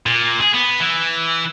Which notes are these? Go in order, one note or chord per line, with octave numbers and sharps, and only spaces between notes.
A#2
G#4
B3
E3